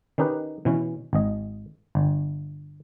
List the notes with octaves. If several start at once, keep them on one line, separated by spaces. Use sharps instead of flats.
D#3 C#4 D#4 G4 B4
B2 E3 C#4
G#1 D#5
G1